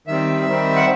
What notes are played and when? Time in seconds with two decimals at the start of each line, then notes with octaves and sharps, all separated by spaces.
0.07 D#3 G3 C4 E5
0.46 D#3 G3 C4
0.76 F#5